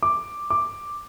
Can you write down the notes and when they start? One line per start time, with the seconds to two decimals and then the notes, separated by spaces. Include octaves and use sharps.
0.03 D6
0.50 D6